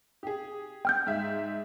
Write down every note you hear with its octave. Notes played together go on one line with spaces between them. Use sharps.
G4 G#4
G5 F6 G6
G#2 E5